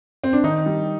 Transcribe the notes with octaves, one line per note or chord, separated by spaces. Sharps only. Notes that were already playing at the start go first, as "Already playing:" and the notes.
C4
D4
D#3 D#4
G3